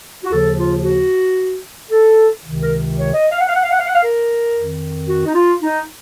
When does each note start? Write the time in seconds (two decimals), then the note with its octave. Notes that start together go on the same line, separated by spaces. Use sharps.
0.24 F#4
0.32 D#2 C#3 F3 A4
0.58 F4
0.85 F#4
1.91 A4
2.44 C#2 C3 D#3
2.61 A#4
2.97 C#5
3.14 D#5
3.32 F5
3.40 F#5
3.48 F5
3.55 F#5
3.63 F5
3.71 F#5
3.79 F5
3.87 F#5
3.95 F5
4.03 A#4
4.55 F2 D#3
5.09 F#4
5.26 D#4
5.35 F4
5.62 D#4